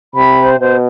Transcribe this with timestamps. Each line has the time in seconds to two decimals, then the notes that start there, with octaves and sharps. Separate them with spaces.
0.15 C3 B5
0.38 C5
0.59 B2 C5